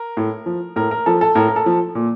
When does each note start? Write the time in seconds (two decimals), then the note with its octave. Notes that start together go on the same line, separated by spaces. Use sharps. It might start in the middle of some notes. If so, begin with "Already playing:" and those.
Already playing: A#4
0.17 A2
0.46 F3
0.76 A2 A#4
0.91 A#4
1.06 F3 A4
1.21 A4
1.35 A2 A#4
1.48 A#4
1.56 A4
1.66 F3
1.95 A#2